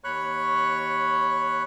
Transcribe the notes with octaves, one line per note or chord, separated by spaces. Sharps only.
D#2 C#5 B5 C#6 F#6